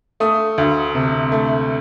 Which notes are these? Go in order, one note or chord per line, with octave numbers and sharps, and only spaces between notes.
A3 D#6
D2
C3
A3